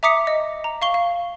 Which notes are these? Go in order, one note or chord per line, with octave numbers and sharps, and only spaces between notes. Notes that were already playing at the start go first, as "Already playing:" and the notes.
E5 A#5 D6 D#6 B6 C#7
D#5
A#5
F5 C#6 G7
F5